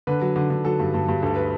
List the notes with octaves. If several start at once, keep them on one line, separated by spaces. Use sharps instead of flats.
D3 B4
F#3
D3
D3
F#3 A4
G2
G2
G2
D2 A4
B4